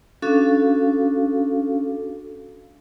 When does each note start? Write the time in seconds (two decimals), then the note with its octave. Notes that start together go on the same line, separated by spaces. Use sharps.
0.22 C#4 D4 F#4 A4 F5